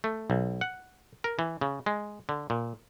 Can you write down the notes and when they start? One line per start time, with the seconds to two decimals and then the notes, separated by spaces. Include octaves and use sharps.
0.04 A3
0.30 B1
0.61 F#5
1.24 A#4
1.39 E3
1.61 C#3
1.86 G#3
2.29 D3
2.50 A#2